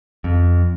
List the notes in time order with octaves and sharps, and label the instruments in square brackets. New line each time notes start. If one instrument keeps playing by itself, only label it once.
[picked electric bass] F2